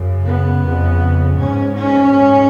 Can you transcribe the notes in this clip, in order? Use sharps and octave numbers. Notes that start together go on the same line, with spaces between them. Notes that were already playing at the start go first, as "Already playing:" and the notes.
Already playing: F#2 C#3
B3
F2 C#3
G#2 C#4
C#4
G#2